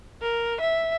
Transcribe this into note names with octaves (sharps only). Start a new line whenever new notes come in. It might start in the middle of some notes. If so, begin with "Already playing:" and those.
A#4
E5